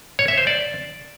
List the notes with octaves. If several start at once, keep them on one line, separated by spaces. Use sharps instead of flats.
C#5
E5
C5
D5